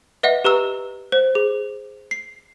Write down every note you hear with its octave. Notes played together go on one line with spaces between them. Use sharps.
B4 D#5 E5 F#5
G4 B4 A#5 E6
C5
G#4
C7